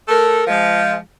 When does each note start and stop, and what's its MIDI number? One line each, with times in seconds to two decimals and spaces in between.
0.08 0.43 57
0.08 0.43 69
0.08 0.43 70
0.47 0.95 53
0.47 0.95 56